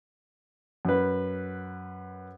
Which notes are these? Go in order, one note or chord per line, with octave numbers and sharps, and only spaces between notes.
F#2 B4